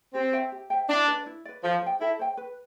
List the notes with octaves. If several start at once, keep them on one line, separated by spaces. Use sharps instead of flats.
C4 G4
C5 E5 G5
G4
C5 E5 G5
D4 E4
B4 D5
E4
B4 D5
F3 A4
C5 G5
E4 A4
C5 G5
B4